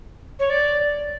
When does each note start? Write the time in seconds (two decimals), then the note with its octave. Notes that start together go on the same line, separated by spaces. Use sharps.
0.39 C#5
0.50 D5